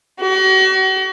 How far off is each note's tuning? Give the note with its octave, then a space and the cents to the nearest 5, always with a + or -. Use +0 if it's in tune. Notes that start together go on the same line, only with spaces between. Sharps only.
F#4 +40